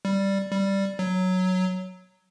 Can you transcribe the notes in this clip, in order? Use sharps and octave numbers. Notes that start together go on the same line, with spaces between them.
G3
G3
F#3